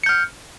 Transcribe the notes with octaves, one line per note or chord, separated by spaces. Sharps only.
F6 G6 C#7